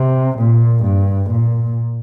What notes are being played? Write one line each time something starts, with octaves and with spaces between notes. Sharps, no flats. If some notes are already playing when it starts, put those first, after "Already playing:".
Already playing: C3
A#2
G2
A#2